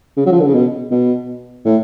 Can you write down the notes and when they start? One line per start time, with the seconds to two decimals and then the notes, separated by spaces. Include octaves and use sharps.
0.17 C#3
0.26 F#3
0.32 F3
0.40 D3
0.47 C#3
0.55 B2
0.91 B2
1.65 A2